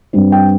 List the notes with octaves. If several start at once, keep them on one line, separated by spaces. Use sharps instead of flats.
G2 G3 C4
G5